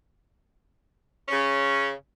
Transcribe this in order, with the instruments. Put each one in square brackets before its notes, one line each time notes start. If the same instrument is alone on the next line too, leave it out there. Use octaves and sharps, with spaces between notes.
[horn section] C#3 C#4